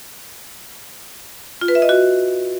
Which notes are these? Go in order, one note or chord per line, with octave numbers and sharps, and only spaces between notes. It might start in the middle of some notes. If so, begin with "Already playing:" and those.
F4
B4
E5
D#5
F#4